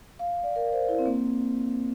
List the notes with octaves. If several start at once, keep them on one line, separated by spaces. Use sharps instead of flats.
F5
D5
A#4
C5
E4
C4
A#3